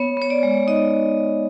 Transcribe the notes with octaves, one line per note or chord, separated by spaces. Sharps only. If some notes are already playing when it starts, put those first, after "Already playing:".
Already playing: B3 C#5
B3 C#5
D5
G#3
D#4 D#5